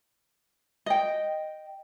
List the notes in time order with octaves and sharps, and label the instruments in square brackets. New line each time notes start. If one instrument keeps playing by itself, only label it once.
[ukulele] D#5 G5